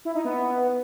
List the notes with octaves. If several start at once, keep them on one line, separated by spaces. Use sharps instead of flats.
E4
D#4
B3